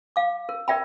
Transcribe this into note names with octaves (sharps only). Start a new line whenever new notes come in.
F5 D6
A#4
A#4 D5 E5 G5 B5